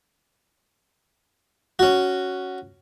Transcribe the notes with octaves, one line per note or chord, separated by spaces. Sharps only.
C#4 F#4